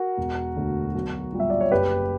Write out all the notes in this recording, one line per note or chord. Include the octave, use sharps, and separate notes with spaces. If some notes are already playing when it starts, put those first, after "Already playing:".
Already playing: F#4 A#4
E1
D2 D3
B1
A#2 G3
E5
D5
C#5
F#1 G4 B4